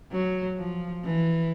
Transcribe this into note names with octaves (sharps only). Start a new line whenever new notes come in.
F#3
F3
E3